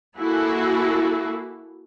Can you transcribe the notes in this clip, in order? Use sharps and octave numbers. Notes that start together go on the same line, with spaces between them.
A#3 E4 F#4 G#4 A4